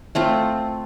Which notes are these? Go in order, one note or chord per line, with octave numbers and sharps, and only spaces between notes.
A3 C4 F4